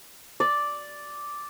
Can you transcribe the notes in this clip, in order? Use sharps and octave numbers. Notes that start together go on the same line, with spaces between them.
D5